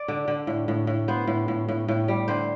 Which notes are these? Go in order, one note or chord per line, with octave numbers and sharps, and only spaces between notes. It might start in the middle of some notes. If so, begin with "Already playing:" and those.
Already playing: D5
D3
D3
A2
A2
A2
B3 C5
A2
A2
A2
A2
G3
D3 C5